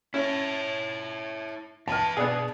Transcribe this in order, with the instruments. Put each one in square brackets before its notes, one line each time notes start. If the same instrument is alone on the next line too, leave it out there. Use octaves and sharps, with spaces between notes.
[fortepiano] C#4 [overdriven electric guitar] E4 C#5
[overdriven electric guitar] E2 B4 [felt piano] A5 F6
[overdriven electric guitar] B2 [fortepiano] B3 D4 G#4